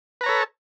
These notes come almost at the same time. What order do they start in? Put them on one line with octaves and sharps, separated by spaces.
B4 A#5 C#5 A4